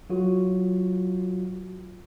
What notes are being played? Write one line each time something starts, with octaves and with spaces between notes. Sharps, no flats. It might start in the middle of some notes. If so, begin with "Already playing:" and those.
F#3 F4 F#4